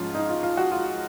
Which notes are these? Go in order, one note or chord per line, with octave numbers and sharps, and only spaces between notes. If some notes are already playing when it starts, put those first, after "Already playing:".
Already playing: G#2 F3 G#3 C#4 F4
D#4
F4
F4
F#4
F4